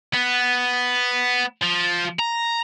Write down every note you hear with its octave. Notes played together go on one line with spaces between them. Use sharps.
B3
F3
A#5